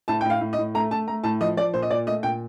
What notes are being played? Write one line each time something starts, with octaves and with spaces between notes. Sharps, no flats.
A2 A5
A2 G5
F5
A2
D#5
A2
A3 A#5
A3 A5
A3 A#5
A2 A5
F3 D#5
F3 D5
A#2 C5
D#5
A#2 D5
A3 D#5
A#2 G5